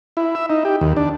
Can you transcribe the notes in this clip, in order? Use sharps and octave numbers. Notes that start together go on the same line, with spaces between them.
E4
E5
D#4
G4
D#2
D4